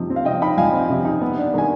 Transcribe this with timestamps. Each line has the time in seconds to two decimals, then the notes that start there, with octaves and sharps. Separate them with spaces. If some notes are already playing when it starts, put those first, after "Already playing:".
Already playing: C3 F3 D#4
0.10 C4
0.16 F5
0.25 C3 D#5 G5
0.42 D#4 G5 B5
0.58 F3 F5 G#5
0.73 C4
0.90 C3
1.05 D#4
1.22 B3
1.38 D4
1.54 D#3 G#5